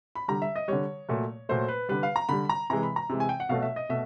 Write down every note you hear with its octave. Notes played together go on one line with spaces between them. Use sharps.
B5
D3 G3 A#5
E5
D#5
D3 G3 C#5
A#2 F#3 A3
A#2 F#3 A3 C5
B4
D3 G3 B4
F5
A#5
D3 G3 B5
A#5
C3 E3 G#3 A#5
B5
A#5
C3 E3 G#3
G#5
G5
F#5
B2 F#3 A3 F5
E5
D#5
B2 A3 E5